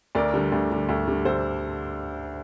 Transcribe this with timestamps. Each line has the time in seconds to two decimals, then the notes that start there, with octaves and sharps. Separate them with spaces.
0.15 D2 A#4 D5
0.34 D3 G3
0.52 D2
0.70 D3 G3
0.89 D2
1.08 D3 G3
1.25 D2 A4 C5